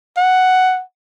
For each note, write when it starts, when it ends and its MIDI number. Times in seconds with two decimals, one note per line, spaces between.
0.17 0.82 78